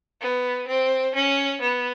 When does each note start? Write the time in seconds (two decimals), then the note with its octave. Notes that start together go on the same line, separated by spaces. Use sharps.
0.21 B3
0.67 C4
1.15 C#4
1.61 B3